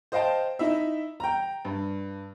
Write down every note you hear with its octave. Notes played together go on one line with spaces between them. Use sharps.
C5 D#5 F5 G5 A5
D#4 E4 E5
G5 A#5
G2